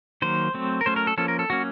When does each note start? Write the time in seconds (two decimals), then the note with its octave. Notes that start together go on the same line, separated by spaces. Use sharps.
0.22 D#3 F#3 A#3 C5
0.54 F#3 A3 C4
0.81 A#4
0.86 F#3 A3 C#4 C5
0.96 A#4
1.07 A4
1.17 F3 A#3 C#4 A4
1.28 A#4
1.39 A4
1.50 F#3 A#3 C#4 F#4